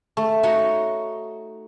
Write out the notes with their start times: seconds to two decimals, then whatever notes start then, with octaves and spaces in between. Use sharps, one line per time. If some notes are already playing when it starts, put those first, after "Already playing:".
0.17 A3
0.43 D#4 F#4 C#5 D#5